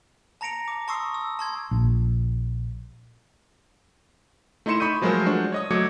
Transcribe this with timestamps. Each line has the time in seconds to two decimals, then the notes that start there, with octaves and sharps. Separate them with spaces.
0.41 A5 A#5 A#6 C#7 D7 F7
0.68 D6
0.88 A5 C6 C#6 D#6 E6 C7
1.14 E6
1.39 A5 C6 G#6
1.71 A#1
4.66 A3 D#4 E4 C6 C#7 E7
4.80 B5 C#6 D#6 G6 D#7
5.02 F3 F#3 G#3 A3 A#4 C5
5.27 D4 F#4 C5
5.52 C#5 D#5 D#6
5.70 F#3 A3 D6 G#6 C#7